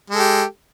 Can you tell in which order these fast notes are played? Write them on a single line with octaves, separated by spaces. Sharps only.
G#3 A4 G4